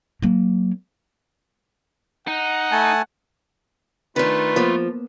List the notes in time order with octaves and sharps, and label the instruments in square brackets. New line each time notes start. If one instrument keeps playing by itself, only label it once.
[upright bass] F#3 A#3
[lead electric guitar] D#4 [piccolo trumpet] F#5
[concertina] A3 G#5 A5
[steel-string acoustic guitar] D#3 D4 [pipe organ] A3 F4 [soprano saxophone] B4
[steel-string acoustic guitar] F3 [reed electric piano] A#3 B3